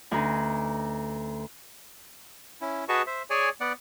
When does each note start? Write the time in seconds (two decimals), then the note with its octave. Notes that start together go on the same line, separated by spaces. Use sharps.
0.11 D2 C#4 D#4 B4 G#5
2.61 C#4 E4
2.89 F#4 G#4 B4 D#5 A5 C#6
3.07 C5 E5
3.30 G#4 C#5 D5 G#5
3.61 B3 D5 F#5